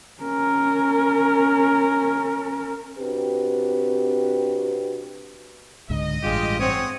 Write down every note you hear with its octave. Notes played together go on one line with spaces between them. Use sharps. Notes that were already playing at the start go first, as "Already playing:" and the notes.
C#4 A#4
C3 C4 D4 F#4 G4 B4
C#2 G#2 D3 D#5
A1 G2 G#3 F4 G4
C4 C#5 F#5 G#5 D#6